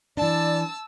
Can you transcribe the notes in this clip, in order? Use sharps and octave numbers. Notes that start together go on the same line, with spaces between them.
E3 D4 D5 A5 E6